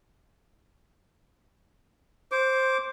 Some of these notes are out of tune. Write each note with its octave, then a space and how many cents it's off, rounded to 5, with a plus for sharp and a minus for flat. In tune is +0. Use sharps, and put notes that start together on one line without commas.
C5 +5 D6 -20